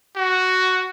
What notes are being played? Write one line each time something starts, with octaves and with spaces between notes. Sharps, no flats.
F#4